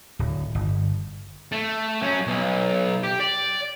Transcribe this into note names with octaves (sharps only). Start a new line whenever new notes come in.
D1
G1
A3
F#3 C#4
B1
G4
D5